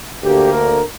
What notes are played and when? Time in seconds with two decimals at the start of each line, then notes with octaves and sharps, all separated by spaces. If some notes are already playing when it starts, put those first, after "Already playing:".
0.23 D2 D3 A#3 G4
0.52 A#4